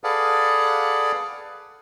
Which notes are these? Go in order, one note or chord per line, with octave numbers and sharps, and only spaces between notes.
G#4 A4 B4 D5 F5 F#5